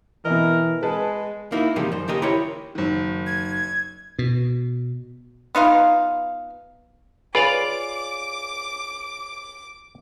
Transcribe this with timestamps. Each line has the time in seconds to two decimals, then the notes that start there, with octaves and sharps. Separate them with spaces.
0.25 B2 E3 A#4 D#5
0.83 G#3 G#4 B4 A5
1.52 A#3 D#4 E4 F#4
1.76 C3 D#3 F3 G3 G#3 A#3
1.92 F#2 C5
2.08 D#2 C#3 G4 A#4 D#5
2.22 E4 G4 A#4 C5 C#5
2.75 F#1 D#3
3.27 G#6
4.19 B2
5.55 B3 D#4 F4 F5
7.35 F4 G#4 B4 C#5 D5 F5 G#5 D6